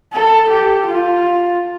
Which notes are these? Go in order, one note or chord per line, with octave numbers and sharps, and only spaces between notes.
A4
G4
F4